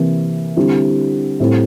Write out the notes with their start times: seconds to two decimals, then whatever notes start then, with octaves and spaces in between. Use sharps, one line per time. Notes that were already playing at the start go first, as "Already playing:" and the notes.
Already playing: C3 E3 A#3 E4
0.56 D3 G3 C4 E4
1.40 A2 G3 C4 E4